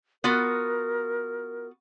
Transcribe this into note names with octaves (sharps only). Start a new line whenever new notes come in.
B3 F4 F#4 A#4